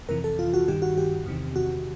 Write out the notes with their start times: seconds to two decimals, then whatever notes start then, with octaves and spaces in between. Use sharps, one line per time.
0.09 F2 C3 E3 A#4
0.24 A4
0.39 F4
0.54 F#4
0.68 G2 D#3 G4
0.82 F#4
0.98 G4
1.26 E2 C3 D#3
1.56 F#4